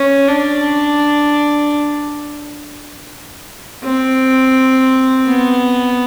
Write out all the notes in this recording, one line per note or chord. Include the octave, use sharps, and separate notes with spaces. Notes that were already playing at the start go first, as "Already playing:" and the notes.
Already playing: C#4
D4
C4
B3